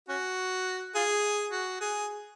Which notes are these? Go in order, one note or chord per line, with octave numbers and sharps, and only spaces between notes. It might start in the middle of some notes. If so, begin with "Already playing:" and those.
C#4 F#4
F4 G#4
F#4
G#4